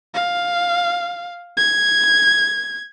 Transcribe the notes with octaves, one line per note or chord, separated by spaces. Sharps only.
F5
G#6